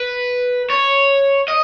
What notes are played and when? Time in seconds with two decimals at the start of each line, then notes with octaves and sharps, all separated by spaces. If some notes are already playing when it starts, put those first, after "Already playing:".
Already playing: B4
0.70 C#5
1.48 D#5